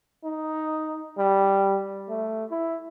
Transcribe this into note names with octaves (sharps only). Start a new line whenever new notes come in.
D#4
G3
A3
E4